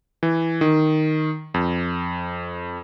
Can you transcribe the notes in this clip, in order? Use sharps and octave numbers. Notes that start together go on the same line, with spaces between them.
E3
D#3
F2